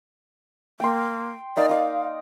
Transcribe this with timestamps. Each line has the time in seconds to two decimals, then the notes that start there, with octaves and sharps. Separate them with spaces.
0.80 A#3 G5 C6
1.57 A#3 D#4 D5 F5
1.69 D#4 D5 F5